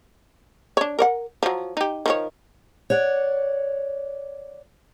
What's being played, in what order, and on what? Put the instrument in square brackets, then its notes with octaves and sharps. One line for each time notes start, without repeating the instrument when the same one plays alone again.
[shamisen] D4 C#5
A#4 C#5 F#5
F3 F#3
D#4 G4
D#3 F3 C#5
[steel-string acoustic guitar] C#5 D5 F#5